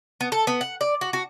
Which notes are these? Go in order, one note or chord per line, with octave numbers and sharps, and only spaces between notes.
B3
A4
B3
F#5
D5
F#4
F#4